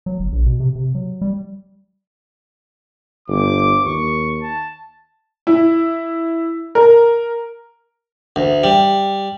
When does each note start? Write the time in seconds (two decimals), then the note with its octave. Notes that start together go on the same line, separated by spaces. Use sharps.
0.06 F#3
0.19 G1
0.32 A#1
0.46 B2
0.60 C3
0.75 C3
0.95 F#3
1.21 G3
3.28 G1 D6
3.85 D#2 C#6
4.42 A5
5.47 E4
6.75 A#4
8.36 D2
8.64 G3